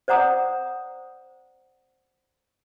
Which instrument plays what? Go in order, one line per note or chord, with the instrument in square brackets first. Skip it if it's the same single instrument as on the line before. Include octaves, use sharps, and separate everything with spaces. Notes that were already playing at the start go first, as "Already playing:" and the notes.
[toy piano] C5 D5 F#5 A#5 D#6